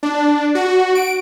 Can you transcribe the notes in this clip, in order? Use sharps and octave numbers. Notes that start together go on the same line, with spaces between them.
D4
F#4
D7